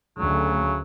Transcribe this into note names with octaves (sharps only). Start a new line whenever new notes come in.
D2 C#3 F#3 A3